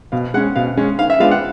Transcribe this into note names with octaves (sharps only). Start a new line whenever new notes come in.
B2 F5
G#3 C#4 F#5
B2 F5
G#3 C#4
D#3 F5
E5
G#3 B3 D4 F4 F5
F#5